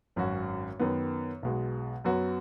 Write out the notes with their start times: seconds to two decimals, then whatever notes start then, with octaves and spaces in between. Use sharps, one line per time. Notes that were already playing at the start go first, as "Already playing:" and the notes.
0.16 G#1 F#2 F#3 C#4 F#4
0.79 F#2 D#3 B3
1.43 B1 B2 G#3
2.04 F#2 F#3 B3 F#4